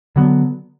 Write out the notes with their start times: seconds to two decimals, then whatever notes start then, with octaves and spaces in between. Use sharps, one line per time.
0.16 D3 F#3 B3